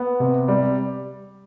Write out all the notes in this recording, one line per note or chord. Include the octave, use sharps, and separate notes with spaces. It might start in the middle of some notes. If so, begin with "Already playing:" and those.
Already playing: B3
C3
G3